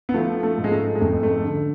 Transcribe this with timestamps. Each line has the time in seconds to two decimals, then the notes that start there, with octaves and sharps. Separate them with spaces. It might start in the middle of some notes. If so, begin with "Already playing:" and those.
0.09 B3
0.14 F3 A3
0.43 A3
0.58 G#2
0.64 G#3
0.71 A3
0.95 G#3
1.01 F2 A3
1.23 A3
1.44 D3